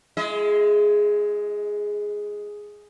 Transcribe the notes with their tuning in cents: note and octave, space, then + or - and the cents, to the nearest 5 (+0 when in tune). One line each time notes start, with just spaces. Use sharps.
G#3 +0 E4 +45 D#5 +40